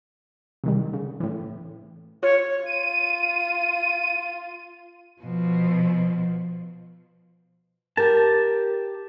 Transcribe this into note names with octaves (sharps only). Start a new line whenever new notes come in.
C3 D#3 G3
C#3
A2 E3
F4 C#5
F4 D#7
B2 F3
G4 A#4 A5